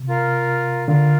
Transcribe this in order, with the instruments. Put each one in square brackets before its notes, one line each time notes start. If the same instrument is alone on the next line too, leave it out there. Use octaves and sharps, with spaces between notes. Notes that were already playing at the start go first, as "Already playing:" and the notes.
Already playing: [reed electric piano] C3
[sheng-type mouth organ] F4 A#4 F5
[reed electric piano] D3 [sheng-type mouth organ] F4 A#4 F5